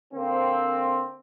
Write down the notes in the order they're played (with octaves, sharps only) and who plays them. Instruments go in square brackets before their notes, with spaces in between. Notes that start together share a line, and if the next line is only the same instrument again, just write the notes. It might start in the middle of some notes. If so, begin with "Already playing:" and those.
[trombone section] D3 A#3 C4